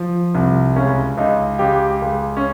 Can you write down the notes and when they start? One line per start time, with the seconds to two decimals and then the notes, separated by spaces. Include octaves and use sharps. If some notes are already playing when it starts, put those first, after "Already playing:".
Already playing: F3
0.35 C2
0.76 C#2 C#4
1.17 C#2 D#4
1.59 C#2 G4
2.02 C#2
2.37 C#4